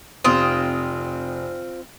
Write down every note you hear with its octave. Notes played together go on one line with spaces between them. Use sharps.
F1 C4 F4 D#6